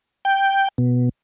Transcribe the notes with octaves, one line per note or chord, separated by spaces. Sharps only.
G5
B2